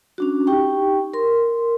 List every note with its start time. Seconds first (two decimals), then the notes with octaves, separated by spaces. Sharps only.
0.18 C#4 D4 F#4
0.47 D#4 G4 G5 C#6
1.13 A#4 C6